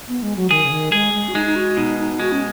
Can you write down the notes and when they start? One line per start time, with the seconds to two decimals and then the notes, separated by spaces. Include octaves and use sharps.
0.08 B3
0.22 G#3
0.36 F#3
0.50 D#3 G#4
0.64 C#3
0.71 D#3
0.92 G#3 G#4
1.13 G#3
1.28 F#4
1.35 G#3 D#4
1.46 D#4
1.56 F#4
1.77 B2 D#4
1.99 D#4
2.20 G#3 F#4
2.32 C#4